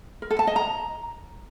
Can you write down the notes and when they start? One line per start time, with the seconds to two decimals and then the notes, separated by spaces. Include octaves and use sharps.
0.22 A#4
0.31 A4
0.39 A5
0.47 D#5
0.56 A#5